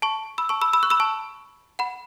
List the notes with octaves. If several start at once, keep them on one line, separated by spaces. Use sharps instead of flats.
A5 C#6
B5 E6
A5 C#6
B5 E6
B5 E6
C#6 F#6
B5 E6
A5 C#6
F#5 B5